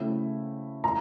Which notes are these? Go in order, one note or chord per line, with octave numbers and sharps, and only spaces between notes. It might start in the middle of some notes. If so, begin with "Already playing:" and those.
Already playing: C#3 F#3 A3 C4 E4
A#5